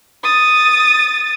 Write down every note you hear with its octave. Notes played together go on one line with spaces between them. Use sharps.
D#6 A6